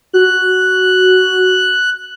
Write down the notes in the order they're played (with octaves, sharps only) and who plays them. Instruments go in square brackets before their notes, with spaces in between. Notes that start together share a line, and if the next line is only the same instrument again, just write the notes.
[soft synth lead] F#4 [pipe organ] F#6